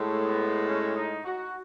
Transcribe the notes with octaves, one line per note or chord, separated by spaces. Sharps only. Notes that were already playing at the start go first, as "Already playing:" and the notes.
Already playing: A2 G#3 A3
B3
C#4
D#4
F#4